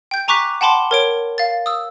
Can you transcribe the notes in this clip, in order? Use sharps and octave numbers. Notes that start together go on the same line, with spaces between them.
G5 G6
G#5 A#5 C#6 D6 F#6 B6
F#5 G5 A5 B5 C6 D6
A#4 C#5 D7
F5 A6
D#6 E6